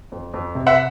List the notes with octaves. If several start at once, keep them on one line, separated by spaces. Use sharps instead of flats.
F2
F2
C3
E5 F#5